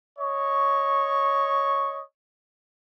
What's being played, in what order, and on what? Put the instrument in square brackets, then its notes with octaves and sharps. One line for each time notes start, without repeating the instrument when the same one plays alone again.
[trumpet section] C#5 D#5 C#6